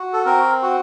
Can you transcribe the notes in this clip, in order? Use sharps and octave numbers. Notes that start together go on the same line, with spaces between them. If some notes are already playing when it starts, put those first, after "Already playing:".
Already playing: F#4
A4
C4 A#4
F#4